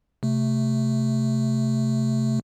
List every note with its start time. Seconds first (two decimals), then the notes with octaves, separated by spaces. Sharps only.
0.23 C3 A3